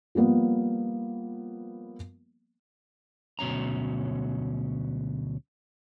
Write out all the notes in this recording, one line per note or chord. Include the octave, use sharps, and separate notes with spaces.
F3 G3 A#3 B3
D2 B2 F#3 C#4 A#5